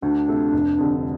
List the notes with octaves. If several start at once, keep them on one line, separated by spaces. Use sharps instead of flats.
D2 D4
C3 A3 F4 A4
F1
F2 D3 G3